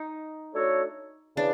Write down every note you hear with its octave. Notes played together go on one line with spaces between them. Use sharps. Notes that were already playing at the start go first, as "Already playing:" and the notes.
Already playing: D#4
A3 D4 F#4 A4 C#5
C#3 E3 D4